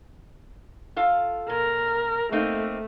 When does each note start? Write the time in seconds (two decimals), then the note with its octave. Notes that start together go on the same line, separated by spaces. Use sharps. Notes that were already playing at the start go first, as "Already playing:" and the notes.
0.96 F4 A4 F5
1.49 A#2 A#4
2.32 A3 A#3 C4 D#4